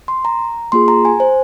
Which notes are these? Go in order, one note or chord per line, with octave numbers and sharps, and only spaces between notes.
C6
A#5
A#3 F4 G#4 C6
A#5
G#5
C5